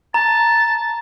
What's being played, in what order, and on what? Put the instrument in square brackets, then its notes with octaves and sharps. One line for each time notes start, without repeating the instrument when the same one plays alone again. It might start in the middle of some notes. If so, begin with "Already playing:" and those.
[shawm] A5 [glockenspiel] A#5